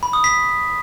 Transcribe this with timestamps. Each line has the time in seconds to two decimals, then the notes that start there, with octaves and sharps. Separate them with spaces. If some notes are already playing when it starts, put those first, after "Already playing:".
0.03 B5
0.13 D#6
0.24 B6